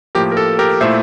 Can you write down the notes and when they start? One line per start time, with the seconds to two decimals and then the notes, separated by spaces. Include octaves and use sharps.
0.15 A2 F3 A#3 G4 A#4
0.32 A#4
0.37 A4
0.59 G4 A#4
0.81 A#2 A3 E4 C5 E5